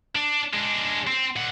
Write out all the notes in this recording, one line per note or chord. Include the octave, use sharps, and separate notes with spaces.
D4
G#3 D4
C4
A#2 F#5